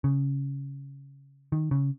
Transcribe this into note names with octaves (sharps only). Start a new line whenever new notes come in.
C#3
D#3
C#3